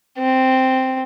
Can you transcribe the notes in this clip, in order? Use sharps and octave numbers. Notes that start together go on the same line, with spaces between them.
C4